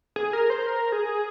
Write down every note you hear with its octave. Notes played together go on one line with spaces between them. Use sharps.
G#4
A#4
C5
A#4
G#4